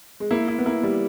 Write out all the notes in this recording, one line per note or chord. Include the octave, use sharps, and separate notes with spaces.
G#3
A#3 E4
E4
B3
A#3 E4
G3